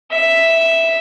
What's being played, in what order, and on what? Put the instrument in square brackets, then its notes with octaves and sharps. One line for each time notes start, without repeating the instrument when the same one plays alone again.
[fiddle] E5